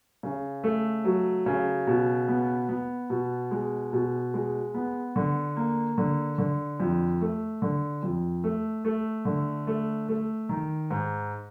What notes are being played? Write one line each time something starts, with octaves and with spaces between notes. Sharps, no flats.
C#3
A3
F#3
C#3
B2
B3
B3
B2
G#3
B2
G#3
B3
D3
A#3
D3
D3
F2
A3
D3
F2
A3
A3
D3
A3
A3
D#3
G#2